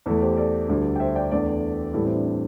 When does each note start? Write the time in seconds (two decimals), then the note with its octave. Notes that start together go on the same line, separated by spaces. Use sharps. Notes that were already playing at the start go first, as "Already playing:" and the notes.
0.06 E2 E3 A3 E4 A4
0.22 G4 C5
0.37 A4 D5
0.68 D2 D3 G3
0.96 G5
1.00 C5 E5
1.15 D5 G5
1.31 E2 D3 A3 A4 D5
1.94 A2 E3 G3 E4 A4
2.05 C4 E4
2.15 D4
2.25 C4